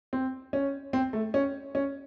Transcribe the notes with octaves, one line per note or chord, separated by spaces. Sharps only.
C4
C#4
C4
A3
C#4
C#4